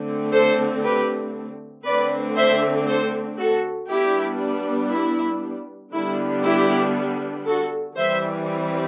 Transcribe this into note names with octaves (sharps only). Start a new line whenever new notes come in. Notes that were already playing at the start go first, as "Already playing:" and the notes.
Already playing: D3 A3 C4
A4 C5
G4 B4
D3 A3 C4 B4 D5
C5 E5
A4 C5
F#4 A4
G3 B3 D4 E4 G4
E4
D3 G3 B3 D4 E4
E4 G4
F#4 A4
E3 G3 C4 C5 E5